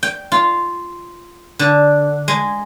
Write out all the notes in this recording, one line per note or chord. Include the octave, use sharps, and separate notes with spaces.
G5
F4
D3
G#3